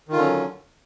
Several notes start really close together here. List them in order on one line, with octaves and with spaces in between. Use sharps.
D#3 F4 D3 C#4 F#3